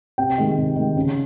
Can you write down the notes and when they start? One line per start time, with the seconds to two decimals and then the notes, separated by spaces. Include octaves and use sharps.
0.18 C3 G5
0.38 D#3 G#3
0.57 C3
0.76 D#3 G#3
0.96 C#3